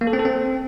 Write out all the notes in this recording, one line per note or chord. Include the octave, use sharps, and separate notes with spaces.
A#3
A4
C4
A4
C4